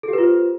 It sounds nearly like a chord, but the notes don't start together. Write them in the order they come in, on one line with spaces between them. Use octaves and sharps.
A4 G4 B4 F4 C5